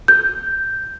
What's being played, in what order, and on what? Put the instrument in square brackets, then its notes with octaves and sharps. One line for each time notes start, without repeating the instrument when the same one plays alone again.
[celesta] G6